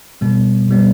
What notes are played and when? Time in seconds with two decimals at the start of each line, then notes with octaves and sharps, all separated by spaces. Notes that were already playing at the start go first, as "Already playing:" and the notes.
0.21 B2 G3 B3
0.68 B2 G3 B3